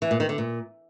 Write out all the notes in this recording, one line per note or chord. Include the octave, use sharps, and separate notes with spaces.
E3
A#2
D#3
D3
A#2